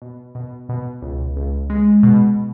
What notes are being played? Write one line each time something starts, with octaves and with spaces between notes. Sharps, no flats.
B2
B2
B2
C#2
C#2
G#3
B2